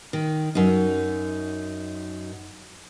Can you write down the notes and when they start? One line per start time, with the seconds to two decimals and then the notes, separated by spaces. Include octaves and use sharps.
0.13 D#3
0.55 F#2 D#4